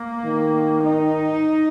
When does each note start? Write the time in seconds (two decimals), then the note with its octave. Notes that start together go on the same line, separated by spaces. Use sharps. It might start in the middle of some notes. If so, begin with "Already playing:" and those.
Already playing: A#3
0.25 D#3
0.83 D#4